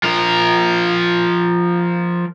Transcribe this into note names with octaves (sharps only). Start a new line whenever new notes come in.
F3 A#4